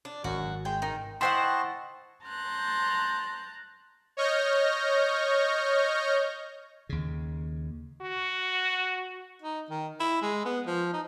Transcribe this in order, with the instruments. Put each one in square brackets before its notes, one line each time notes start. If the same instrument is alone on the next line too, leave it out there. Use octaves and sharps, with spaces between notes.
[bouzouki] D4
[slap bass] G#1 [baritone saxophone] F#2 [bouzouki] F#4
[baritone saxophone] G#3 [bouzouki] G5
[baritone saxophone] D#3 [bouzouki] D#4
[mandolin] E4 C5 F#5 [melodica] D#5 A5 C#6 [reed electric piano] G5 C6
[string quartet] A5 A#5 C6 F#6 G6
[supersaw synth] C#5 D#5 C#6 F6 G6 A#6
[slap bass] D#2 C#3
[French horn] F#4
[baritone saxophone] D#4
D#3
E4
G#3
B3
F3
D#4